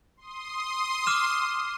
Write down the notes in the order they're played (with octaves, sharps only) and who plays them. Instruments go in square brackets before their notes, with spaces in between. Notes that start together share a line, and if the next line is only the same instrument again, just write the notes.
[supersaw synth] C6 D#6
[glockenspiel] D6 F6 E7